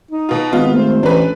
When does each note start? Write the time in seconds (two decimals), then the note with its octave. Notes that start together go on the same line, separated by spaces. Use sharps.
0.11 D#4
0.29 B2 F4
0.53 G#1 B3 F4 D#5
0.73 A3 C5
1.03 A1 D4 B4